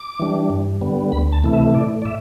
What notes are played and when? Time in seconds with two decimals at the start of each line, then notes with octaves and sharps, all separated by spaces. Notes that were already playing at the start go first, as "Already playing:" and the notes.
Already playing: D6
0.19 E3 G3 D4
0.50 G2
0.81 D3 G3 B3
1.12 D2 B5
1.32 A5
1.44 C3 E3 A3 E4
1.53 E5
1.74 A2 D5
2.02 D5
2.05 E5